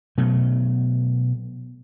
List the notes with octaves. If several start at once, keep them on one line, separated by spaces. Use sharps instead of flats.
B2 F#3 A3